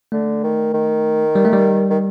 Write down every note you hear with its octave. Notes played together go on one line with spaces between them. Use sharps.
D3 A3
D#3
D#3
G3
A3
G3
D#3